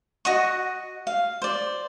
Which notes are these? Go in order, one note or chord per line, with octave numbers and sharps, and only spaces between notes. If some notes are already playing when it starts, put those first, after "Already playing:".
F#4 D#5 F#5 C#6
F5
C5 D5